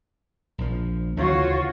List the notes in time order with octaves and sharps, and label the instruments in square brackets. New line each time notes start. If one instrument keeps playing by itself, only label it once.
[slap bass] A#1 F3
[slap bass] D2 C#3 E3 [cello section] F4 F#4 C#5